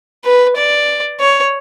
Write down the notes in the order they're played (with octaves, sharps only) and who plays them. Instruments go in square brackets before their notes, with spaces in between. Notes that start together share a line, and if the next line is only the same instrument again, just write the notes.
[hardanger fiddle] B4
D5
C#5